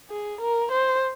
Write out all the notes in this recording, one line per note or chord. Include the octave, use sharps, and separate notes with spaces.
G#4
A#4
C5